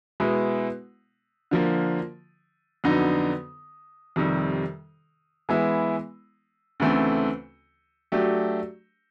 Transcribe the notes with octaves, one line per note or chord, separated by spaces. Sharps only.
B2 G#3 B3 E4
D3 F3 A#3
F2 D3 F#3 B3 D#4
F2 C3 D#3 G3
E3 G#3 B3 E4
D2 C#3 E3 A3 C4
F#3 A3 D4 G4